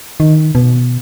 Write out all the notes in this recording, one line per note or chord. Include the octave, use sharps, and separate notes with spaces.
D#3
B2